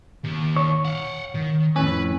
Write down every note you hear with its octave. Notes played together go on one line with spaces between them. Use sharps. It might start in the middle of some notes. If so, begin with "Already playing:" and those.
D#2
C#5
F5 F#5
D#3
F2 A2 C#4 B4